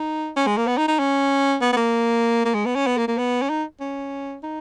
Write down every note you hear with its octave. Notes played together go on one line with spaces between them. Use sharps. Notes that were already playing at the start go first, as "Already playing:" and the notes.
Already playing: D#4
C#4
G#3
A#3
B3
D#4
D#4
C#4
B3
B3
A#3
A#3
G#3
B3
C#4
B3
A#3
A#3
B3
C#4
D#4
C#4
D#4